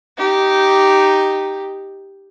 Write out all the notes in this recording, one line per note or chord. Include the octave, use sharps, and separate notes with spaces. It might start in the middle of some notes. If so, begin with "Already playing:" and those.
D#4 G4